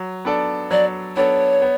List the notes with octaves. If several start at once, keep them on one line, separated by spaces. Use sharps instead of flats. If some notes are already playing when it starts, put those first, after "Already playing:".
Already playing: F#3
B3 D4 A4 D5
F#3 D5
B3 D4 A4 C#5 D5
B3